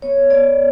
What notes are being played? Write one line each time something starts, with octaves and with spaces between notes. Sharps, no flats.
B3 C#5
B3 D5